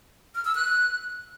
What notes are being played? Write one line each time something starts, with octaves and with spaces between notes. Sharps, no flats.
F6
E6
F#6